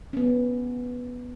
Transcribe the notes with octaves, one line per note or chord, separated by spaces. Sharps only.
B3 C#4